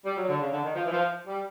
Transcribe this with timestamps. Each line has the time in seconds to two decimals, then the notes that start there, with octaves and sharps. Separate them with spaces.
0.05 G3
0.18 F#3
0.29 D3
0.40 C#3
0.52 D3
0.63 D#3
0.75 F3
0.86 E3
0.92 F3
1.27 G3